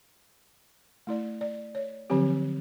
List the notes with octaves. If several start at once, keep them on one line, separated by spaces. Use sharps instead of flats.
A3 E4 D5
D5
C#5
D3 F3 F#3 C4 G4